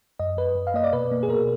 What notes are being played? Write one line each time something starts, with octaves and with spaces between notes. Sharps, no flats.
F#2 D#5
F#2 B4
F#2
F5
A#3 D#5
D5
B2 B4
A#3
G#4
B2 A#4